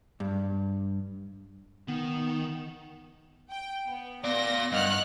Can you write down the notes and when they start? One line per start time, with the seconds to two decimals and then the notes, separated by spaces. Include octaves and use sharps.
0.20 G2
1.88 D#3 B3
3.50 G5
3.86 B3
4.24 B3 D5 F5 A#6
4.72 G2 D#5 F#5 F6 F#6